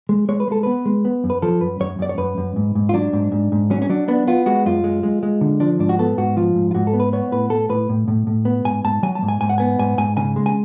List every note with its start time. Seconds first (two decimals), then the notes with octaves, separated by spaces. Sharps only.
0.09 G#3
0.29 G#3 C#5
0.40 B4
0.48 G#3 A4
0.63 B3 B4
0.86 G#3
1.05 B3
1.24 F#2
1.30 B4
1.42 F3 A4
1.61 F#2 B4
1.80 F#2 C#5
1.99 F#2 D5
2.09 C#5
2.18 F#2 B4
2.38 F#2
2.56 G#2
2.75 G#2
2.89 F4
2.94 F#3 D4
3.13 G#2
3.32 G#2
3.52 G#2
3.70 F#3 C#4
3.82 C#4
3.90 F#3 D4
4.08 B3 D4
4.27 B3 F4
4.46 G#3 F#4
4.66 F#2 F4
4.84 G#3
5.03 G#3
5.23 G#3
5.41 D3
5.60 F3 D4
5.79 G#2 D4
5.89 F#4
5.99 B3 A4
6.17 G#2 F#4
6.37 F3 F4
6.55 G#2
6.71 F4
6.75 G#2 F#4
6.87 A4
6.93 B3
7.00 B4
7.13 B3 C#5
7.32 A2 B4
7.50 A2 A4
7.69 A2 B4
7.89 A2
8.08 A2
8.27 A2
8.45 B3
8.65 G#2 G#5
8.84 G#2 A5
9.03 F#3 G#5
9.15 A5
9.22 G#2
9.28 G#5
9.41 G#2 G#5
9.49 F#5
9.58 B3 G#5
9.79 G#2 G#5
9.98 G#2 G#5
10.17 C#3 G#5
10.36 G#3
10.46 G#5